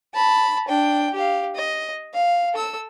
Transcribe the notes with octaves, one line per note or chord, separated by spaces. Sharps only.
A5 B5
D4 G5
G4 F5
D#5
F5
A4 E6